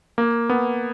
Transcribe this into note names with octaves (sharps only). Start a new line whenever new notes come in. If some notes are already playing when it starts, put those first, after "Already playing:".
A#3
B3